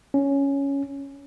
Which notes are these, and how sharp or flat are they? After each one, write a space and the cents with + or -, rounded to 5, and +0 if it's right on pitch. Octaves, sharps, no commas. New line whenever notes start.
C#4 +5